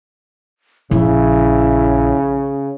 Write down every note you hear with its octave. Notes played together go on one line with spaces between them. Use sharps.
A#1 C#3 E4